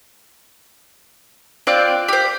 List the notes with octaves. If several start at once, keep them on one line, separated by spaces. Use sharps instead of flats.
C4 F4 D5 F#6
G4 C5